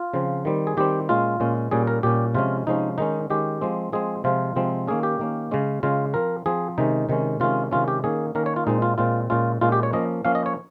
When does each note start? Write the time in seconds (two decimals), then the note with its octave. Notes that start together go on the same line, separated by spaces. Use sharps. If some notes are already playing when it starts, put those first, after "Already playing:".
Already playing: F4
0.14 C#3 F3 C4
0.45 D#3 G3 C4
0.67 G#4
0.77 D#3 G3 C4 G4
1.09 A#2 G#3 C#4 F4
1.40 A#2 G#3 C#4
1.71 A#2 G3 C#4 G#4
1.87 A#4
2.03 A#2 G3 C#4 G4
2.35 C3 F3 G#3 C#4 F4
2.67 C3 F3 G#3 C#4 D#4
2.98 D#3 G#3 C#4 D#4
3.30 D#3 G#3 C#4 G4
3.61 F3 G#3 C4
3.93 F3 G#3 C4 G#4
4.24 C3 F3 G#3 C4 F4
4.56 C3 F3 G#3 C4
4.87 D#3 A#3 C#4 G#4
5.03 G4
5.19 D#3 A#3 C#4
5.51 C#3 G#3 C#4
5.83 C#3 G#3 C#4 F4
6.14 F3 C4 A#4
6.46 F3 C4 G#4
6.78 C3 D#3 G#3 C#4 D#4
7.09 C3 D#3 G#3 C#4
7.40 C3 D#3 G#3 C#4 F4
7.71 C3 D#3 G#3 C#4 F4
7.88 G4
8.04 D#3 A#3 C#4 G#4
8.35 D#3 A#3 C#4 A#4
8.46 C#5
8.56 F4
8.67 A#2 G#3 C4 D#4
8.82 F4
8.98 A#2 G#3 C4 F4
9.30 A#2 G#3 C#4 F4
9.61 A#2 G#3 C#4 F4
9.72 G4
9.83 C#5
9.93 F3 A#3 C#4 D#5
10.25 F3 A#3 C#4 F5
10.35 D#5
10.46 C#5